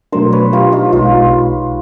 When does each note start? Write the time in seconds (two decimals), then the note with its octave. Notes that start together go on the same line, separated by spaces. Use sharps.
0.12 B2 F#3 A3 D4 A#4 C5
0.32 B4 C#5
0.53 F4 G4
0.72 D#4 F4
0.92 B1 B2 G#3 D#4 F4